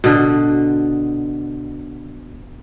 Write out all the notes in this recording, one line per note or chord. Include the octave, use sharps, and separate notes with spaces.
B2 D3